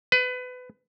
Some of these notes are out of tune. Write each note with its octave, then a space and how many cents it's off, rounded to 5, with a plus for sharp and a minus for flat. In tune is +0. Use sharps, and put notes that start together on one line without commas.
B4 +25